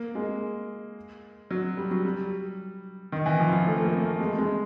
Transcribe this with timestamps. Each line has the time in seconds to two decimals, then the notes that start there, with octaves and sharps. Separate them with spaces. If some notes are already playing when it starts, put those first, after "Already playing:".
Already playing: A#3
0.15 G#3
1.51 F#3
1.77 G3
1.91 F#3
2.05 G3
3.12 D#3
3.26 E3
3.40 F3
3.53 F3
3.66 A3
3.78 A3
3.84 A#3
4.02 A3
4.20 G#3
4.38 G#3